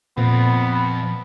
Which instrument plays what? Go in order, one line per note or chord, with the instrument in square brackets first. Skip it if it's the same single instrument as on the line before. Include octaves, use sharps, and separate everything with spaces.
[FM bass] A#2 [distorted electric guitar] F3 C4 [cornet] B3